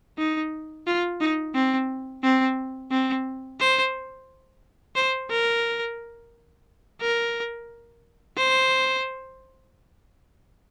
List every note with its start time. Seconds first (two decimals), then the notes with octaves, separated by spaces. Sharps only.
0.18 D#4
0.87 F4
1.21 D#4
1.55 C4
2.23 C4
2.91 C4
3.60 C5
4.96 C5
5.30 A#4
7.01 A#4
8.37 C5